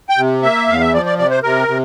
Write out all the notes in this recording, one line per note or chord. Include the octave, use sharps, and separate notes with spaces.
G5
C3
A#3 E5
E2 F5
E5
F3 D5
D5
C3 D5
C5
C3 A#4
C3